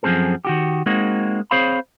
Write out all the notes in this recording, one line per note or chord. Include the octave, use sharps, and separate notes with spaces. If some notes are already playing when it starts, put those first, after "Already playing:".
F#2 F3 A3 C4 G#4 A4
D#3 F#4 G4
G#3 A#3 C4 D#4 F#4
C4 G#4 C5 C#5 F5 B5